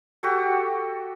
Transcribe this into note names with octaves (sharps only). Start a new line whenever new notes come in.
F#4 G4 A4